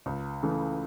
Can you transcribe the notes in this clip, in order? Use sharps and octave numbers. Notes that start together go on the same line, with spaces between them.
C#2
C#3 E3 A3